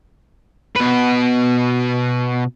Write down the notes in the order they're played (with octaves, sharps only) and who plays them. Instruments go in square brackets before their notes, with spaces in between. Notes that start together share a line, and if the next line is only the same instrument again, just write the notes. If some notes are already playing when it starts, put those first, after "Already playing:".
[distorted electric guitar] B2 B4